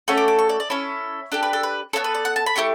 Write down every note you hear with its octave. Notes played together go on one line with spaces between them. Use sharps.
A3 C#4 F#4 A4 C#6
D6
D6
C#6
D5
D5
C#4 E4 A4 C#5
D4 G4 A4
B4
A4
B4
B3 E4 A4 C#5
B4
D5
F#5
A5
B5
A3 E4 G4 C#6